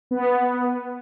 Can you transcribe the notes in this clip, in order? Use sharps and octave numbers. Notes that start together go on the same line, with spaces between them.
B3